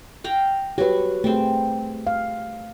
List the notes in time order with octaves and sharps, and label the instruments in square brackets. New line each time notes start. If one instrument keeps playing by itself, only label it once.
[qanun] F5 G5 A#5
[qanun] F#3 F#4 [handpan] G4 B4
[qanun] G3 C4 [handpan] A3 G#4
[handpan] F5